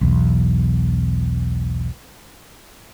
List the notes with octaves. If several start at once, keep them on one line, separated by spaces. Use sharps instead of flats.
B1 E2